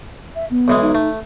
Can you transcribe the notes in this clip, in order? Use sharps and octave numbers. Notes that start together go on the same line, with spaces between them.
E5
B3
B1 E3 G#3
D#4
A3